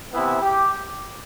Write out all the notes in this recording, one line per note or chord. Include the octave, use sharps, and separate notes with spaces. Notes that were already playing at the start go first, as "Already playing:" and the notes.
C3 E3 B3 E4
G4